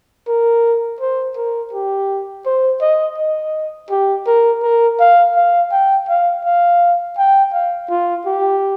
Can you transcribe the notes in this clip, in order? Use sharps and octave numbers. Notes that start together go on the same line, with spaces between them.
A#4
C5
A#4
G4
C5
D#5
D#5
G4
A#4
A#4
F5
F5
G5
F5
F5
G5
F5
F4
G4